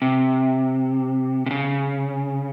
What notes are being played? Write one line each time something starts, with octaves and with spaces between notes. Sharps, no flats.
C3
C3
C#3